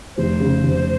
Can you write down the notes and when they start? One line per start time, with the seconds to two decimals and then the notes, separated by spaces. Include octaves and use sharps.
0.17 F1 C5
0.40 C#3
0.64 F1